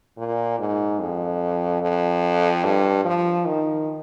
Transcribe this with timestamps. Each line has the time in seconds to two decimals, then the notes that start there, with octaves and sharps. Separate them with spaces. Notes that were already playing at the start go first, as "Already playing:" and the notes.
0.18 A#2
0.59 G#2
1.00 F2
1.82 F2
2.64 G2
3.05 F3
3.45 D#3